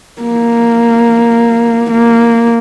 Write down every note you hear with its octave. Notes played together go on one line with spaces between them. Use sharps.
A#3
A#3